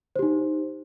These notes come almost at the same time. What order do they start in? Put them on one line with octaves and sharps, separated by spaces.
C5 G4 D#4